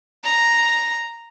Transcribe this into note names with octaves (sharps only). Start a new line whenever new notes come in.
A#5